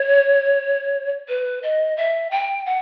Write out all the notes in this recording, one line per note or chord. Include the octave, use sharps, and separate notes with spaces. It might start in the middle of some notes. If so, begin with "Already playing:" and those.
Already playing: C#5
B4
D#5
E5
G5
F#5